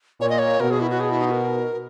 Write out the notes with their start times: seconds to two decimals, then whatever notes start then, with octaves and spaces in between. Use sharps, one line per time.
0.20 A#2 C#5
0.30 D#5
0.39 C#5
0.60 B2 A#4
0.71 G#4
0.80 E4
0.90 F#4
1.00 G#4
1.11 E4
1.20 D#4
1.31 A#4